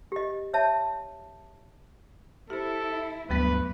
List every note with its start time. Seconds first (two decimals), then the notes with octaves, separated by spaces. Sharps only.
0.12 G4 D#5
0.54 C#5 E5 A5
2.50 E4 G4 A4 C5
3.30 D2 G2 F#3 A3 B3 B4